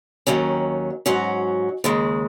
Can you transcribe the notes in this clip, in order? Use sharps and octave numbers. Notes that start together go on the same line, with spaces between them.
D#2 D#3 F#3 C#4
G#2 F#3 C#4 F#4
D#2 C#3 G#3